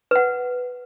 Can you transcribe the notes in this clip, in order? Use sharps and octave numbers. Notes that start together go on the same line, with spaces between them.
B4 F#5